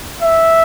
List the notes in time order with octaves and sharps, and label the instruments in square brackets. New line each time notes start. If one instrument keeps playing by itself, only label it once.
[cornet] E5